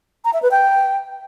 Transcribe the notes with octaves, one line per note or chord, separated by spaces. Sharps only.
A#5
E5
B4
G5